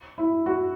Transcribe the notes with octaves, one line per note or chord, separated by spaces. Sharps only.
E4
F#4